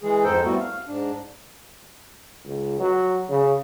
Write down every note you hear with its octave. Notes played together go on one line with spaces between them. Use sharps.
E3 G#3 G#4
F2 G#2 D#4 A4 C5 G5
G3 A3 B3 C4 E4 F#4
F5
G#2 D4
C#2
F#3
C#3